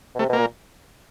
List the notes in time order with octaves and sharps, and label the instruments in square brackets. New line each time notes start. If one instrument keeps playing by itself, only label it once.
[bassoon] B2
[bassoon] C3 [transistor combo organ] A3
[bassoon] B2
[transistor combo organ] A#3
[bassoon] A#2